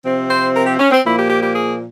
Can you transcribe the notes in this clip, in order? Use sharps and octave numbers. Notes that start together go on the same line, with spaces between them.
C3 F3 C4
C5
A#4
G4
C#4
C4
A#2 F3 A#3 E4
G4
G4
G4
G#4